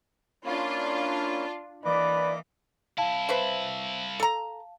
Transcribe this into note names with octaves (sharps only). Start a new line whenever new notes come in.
A#3 C#4 D4 E4 F4
E3 A#3 B4 D5 D#5 D6
C2 E4 F5 A5
B4 C5 E5
A4 A#5